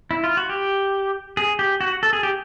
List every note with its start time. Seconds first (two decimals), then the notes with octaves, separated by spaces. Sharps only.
0.11 E4
0.24 F4
0.37 F#4
0.49 G4
1.37 G#4
1.59 G4
1.81 F#4
2.03 A4
2.13 G#4
2.23 G4